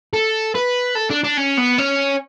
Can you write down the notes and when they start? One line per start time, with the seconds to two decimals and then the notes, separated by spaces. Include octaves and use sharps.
0.13 A4
0.55 B4
0.95 A4
1.10 D4
1.24 D4
1.37 C#4
1.57 B3
1.78 C#4